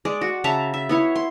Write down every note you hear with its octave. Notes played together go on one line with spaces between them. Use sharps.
G#3 D5
F#4
C#3 E5 A5 A#5
E5
B3 E4 C#5
C6